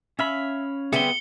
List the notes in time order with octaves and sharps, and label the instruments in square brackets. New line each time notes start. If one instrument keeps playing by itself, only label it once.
[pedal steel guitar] C#4 F5 B5 [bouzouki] E5
[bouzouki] D3 G3 C4 [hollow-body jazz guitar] B3 G#4 E5 [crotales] C#7 G7